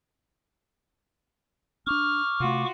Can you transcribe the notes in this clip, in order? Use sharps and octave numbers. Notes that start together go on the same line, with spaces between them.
C#4 D4 C#6 D6 F6
C3 A3 F4 F#4